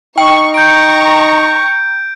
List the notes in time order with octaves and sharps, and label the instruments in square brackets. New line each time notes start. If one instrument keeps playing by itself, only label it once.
[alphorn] D#4 [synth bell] G5 [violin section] C#6
[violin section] A#5 C#6 [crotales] G6 D7